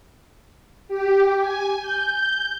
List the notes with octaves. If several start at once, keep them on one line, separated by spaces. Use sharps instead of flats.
G4
G#5
G6